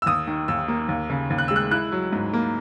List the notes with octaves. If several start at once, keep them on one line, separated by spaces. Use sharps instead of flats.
E6
D#2 D#6
D#3
D#2 E6
A#3
D#2
C#3
D#2
F#6
G#3 E6
F#6
E4 F#6
F#3
G#2
A#3